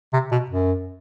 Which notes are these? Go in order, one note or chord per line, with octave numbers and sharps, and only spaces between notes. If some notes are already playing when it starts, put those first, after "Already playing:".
C3
B2
F#2